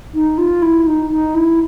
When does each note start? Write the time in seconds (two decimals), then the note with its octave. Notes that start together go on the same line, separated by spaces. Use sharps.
0.14 D#4
0.38 F4
0.62 E4
0.86 D#4
1.11 D#4
1.35 E4